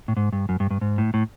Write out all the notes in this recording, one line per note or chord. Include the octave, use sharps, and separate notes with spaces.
A2
G#2
G2
F#2
G2
G2
G#2
A2
A2